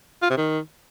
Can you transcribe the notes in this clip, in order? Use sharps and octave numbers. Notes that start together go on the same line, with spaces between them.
F4
C3
D#3